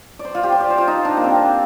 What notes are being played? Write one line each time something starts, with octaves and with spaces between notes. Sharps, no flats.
D5
C5
F4
G4
C5
D5
C5
F4
D#4
D4
A#3
C4